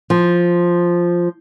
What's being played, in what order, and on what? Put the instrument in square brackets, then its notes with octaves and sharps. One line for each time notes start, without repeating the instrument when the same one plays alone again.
[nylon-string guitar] F3